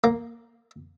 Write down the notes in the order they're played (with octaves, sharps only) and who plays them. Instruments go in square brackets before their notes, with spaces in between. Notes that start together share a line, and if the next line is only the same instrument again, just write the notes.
[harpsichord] A#3